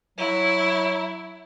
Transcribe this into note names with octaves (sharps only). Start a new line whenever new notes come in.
F#3 E4